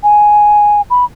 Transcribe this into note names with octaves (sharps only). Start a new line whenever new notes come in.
G#5
B5